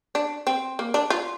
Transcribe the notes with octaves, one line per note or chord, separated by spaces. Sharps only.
D4
C4
A#3
D4
F4